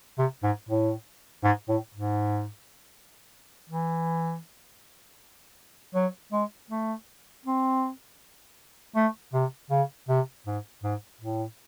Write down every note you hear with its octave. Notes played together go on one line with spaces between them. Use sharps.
C3
G#2
A2
G#2
A2
G#2
E3
F#3
G#3
A3
C4
A3
C3
C#3
C3
G#2
G#2
A2